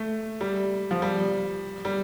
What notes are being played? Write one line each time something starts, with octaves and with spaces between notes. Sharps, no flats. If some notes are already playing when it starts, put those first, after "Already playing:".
Already playing: A3
G3
F3
G3
G3